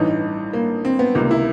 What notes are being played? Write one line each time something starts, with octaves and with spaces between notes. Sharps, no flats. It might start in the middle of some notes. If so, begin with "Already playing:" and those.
Already playing: A1 G2 E3 D#4
A#3
C4
B3
C#2 C3 D#3 A#3
E4